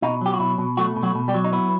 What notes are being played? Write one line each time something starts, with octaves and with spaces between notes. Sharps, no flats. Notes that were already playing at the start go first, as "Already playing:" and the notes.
B2 D#4
F#3 G4
F#4
B2 E4
B2
F#3 A3 F#4
B2
F#3 F#4
B2
G3 G4
F#3
D#4
B3 E4